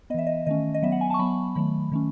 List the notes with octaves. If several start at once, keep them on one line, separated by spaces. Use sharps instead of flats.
E3 B3 D#5 E5
D#5
D#3 A3 C#4 D#5
D#5
F#3 B3 E5
F#5
G#5
A5 C#6
F#3 B3 B5
D#3 F#3 A3 B5
D#3 A3 C#4